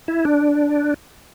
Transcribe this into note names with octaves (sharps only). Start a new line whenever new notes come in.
E4
D4